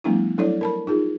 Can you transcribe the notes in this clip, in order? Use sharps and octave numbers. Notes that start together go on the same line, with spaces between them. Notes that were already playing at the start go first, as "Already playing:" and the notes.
F3 G3 A3 B3 D4 E4
F#3 D4 E4 A4 C#5 D5
A#4 A5 B5
D#4 F4 G#4